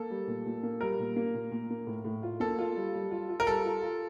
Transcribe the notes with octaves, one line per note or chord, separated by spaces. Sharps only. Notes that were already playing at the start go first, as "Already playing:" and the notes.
Already playing: A#3 A4
G3
A#2
A#2
A#3
G3 A#4
A#2
A#3
A#2
A#2
A#3
A2
A2
F4
A#3 A4
F4
G3
G3
F4
F4
A#4
G3 A4
F4
F4